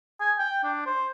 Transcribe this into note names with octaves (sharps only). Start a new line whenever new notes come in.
G#5
G5
D4
C5